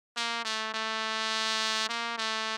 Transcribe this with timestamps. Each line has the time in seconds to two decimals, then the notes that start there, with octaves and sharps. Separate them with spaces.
0.17 A#3
0.45 A3
0.74 A3
1.89 A#3
2.18 A3